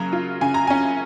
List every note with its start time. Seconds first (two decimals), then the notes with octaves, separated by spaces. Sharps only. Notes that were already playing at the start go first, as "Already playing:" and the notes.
Already playing: C#3 F#3 A#3 A#5
0.13 F4
0.41 C#3 G#5
0.54 A#5
0.67 C#4 G#5